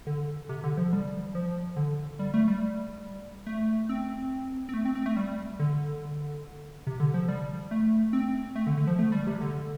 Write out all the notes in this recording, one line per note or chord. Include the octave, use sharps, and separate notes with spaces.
D3
C3
D3
F3
G3
F3
D3
G3
A3
G3
A3
C4
C4
A3
C4
C4
A3
G3
D3
C3
D3
F3
G3
A3
C4
A3
D3
D3
F3
A3
G3
C3
D3